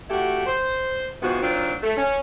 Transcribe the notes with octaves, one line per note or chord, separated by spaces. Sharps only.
A3 E4 F#4 G4
C5
G#2 C3 F3 B3 F#4
D#3 F#3 C4 D4 F4
A3
C#4